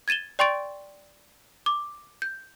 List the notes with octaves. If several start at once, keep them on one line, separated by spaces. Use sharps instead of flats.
G#6 A6 D#7 E7 G7
D5 G5 C6 C#6 A6 D7
D6
G6